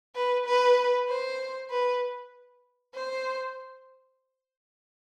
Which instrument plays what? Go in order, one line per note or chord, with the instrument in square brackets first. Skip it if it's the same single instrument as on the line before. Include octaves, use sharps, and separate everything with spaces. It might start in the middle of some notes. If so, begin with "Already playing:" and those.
[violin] B4
B4
C5
B4
C5